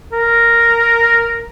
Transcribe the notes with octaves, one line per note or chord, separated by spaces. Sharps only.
A#4